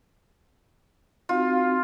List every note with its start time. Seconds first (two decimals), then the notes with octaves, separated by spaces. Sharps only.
1.29 C4 D#4 F4 F#4